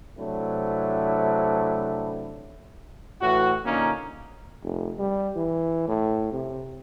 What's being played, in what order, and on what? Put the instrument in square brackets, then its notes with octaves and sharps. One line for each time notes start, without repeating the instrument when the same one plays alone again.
[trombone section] C3 F#3 A3 C4 D4 E4
A2 E3 F#4
A#2 D3 A#3 C#4 D#4
[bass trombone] F1
G3
E3
A2
C3